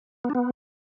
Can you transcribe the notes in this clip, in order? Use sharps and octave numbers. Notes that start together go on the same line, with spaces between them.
B3
D4
B3